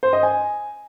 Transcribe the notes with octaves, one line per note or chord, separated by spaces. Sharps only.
C5
D#5
G#5